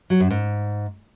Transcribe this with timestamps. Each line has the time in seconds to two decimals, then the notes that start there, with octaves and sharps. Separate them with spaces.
0.10 F#3
0.20 F#2
0.31 G#2